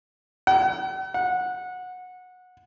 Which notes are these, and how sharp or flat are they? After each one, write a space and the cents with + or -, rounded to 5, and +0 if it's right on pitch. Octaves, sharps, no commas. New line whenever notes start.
F#5 +45
F#5 -20